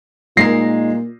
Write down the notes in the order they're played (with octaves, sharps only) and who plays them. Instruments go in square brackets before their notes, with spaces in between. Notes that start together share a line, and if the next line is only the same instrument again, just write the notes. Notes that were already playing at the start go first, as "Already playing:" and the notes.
[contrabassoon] A#2 [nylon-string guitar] G#3 D#4 A#4 [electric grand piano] A#6 C7